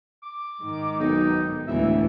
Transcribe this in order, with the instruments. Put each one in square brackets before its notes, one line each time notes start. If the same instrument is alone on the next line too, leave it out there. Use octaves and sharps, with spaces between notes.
[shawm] D6
[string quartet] G#2 D#3
[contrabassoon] B1 [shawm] D#4
[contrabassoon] E1 [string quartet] D2 A2 E3 [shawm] E5